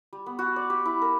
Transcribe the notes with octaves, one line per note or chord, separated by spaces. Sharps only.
G3
B3
F#4
D5
G4
E4
A#4